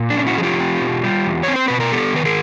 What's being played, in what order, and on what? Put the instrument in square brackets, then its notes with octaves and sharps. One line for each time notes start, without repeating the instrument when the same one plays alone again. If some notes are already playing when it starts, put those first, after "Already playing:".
Already playing: [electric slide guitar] A#2
D4
C#4
E4 F#4
F3 G#4
F4 G4
C4
B2
G3
E2
C4 C#5
C5
B2 B4
A#4
B3 G4 A4
D#3 B4
G#4 A#4